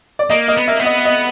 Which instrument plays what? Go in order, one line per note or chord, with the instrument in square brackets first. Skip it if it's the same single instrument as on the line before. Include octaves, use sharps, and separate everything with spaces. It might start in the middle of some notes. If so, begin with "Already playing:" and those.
[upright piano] D5
[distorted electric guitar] A#3 [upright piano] D#5
[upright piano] D#5
[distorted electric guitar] B3
[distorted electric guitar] A#3 [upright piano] E5
[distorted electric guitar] B3
[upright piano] D#5
D#5